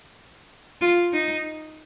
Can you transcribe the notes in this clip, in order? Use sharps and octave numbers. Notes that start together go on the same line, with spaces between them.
F4
D#4